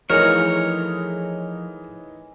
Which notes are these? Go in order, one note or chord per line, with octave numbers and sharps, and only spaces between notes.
E3 F3 A3 D#4 G#4 A#4 C#5